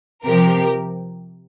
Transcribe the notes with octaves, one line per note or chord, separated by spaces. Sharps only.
C3 F3 G4 A#4